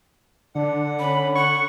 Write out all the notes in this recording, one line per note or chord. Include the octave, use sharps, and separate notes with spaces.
D3 D4 F#5
C#4 B5
F#5 C#6